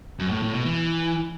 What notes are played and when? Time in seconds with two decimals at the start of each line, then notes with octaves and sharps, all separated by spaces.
0.19 F#2
0.31 A2
0.42 A2
0.54 B2
0.65 E3